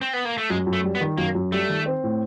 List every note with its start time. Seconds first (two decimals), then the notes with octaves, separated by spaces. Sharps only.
0.01 C4
0.13 B3
0.25 A#3
0.38 A3
0.50 F#2 G#3
0.67 F#2
0.73 A3
0.84 G3
0.95 B3
1.01 D#3
1.18 F#2 A#3
1.35 F#2
1.52 G3 A3
1.69 D#3
1.86 C4
2.03 A2